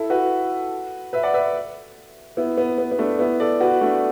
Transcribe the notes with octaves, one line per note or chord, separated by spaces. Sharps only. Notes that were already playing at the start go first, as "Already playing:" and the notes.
Already playing: E4 A4
F#4 B4
B4 E5
D5 F#5
B4 E5
B3 E4
B3
B3
B3
A3 D4
B3 E4
A4 D5
F#4 B4
A3 D4